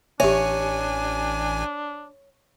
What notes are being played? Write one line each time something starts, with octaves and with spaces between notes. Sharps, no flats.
A1 D4 G4 C#5 E5 G#5